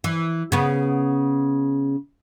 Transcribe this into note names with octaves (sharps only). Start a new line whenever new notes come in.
E3
C#3 B3